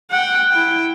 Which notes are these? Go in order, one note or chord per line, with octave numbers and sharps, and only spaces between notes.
F#5 G5
E4 G5